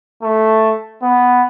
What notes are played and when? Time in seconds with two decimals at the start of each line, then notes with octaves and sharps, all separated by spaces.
0.23 A3
1.02 B3